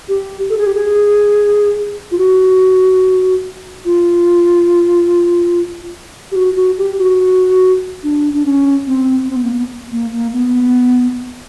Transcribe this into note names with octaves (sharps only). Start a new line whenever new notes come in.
G4
A4
G#4
G4
G#4
F4
F#4
F4
G4
F#4
F#4
G4
F#4
D4
D4
C#4
C4
C4
B3
A#3
B3
A#3
A#3
B3